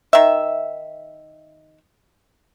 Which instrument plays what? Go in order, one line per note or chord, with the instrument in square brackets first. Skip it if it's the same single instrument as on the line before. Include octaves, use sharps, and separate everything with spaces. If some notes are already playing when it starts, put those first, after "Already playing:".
[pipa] D#3 E5